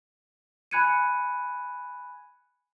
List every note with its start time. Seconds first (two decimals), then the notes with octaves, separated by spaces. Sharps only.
0.71 G#5 B5 F#6 G#6 C#7 D#7